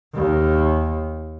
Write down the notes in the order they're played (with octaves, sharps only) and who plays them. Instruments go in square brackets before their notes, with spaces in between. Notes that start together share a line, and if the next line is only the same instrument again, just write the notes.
[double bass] D#2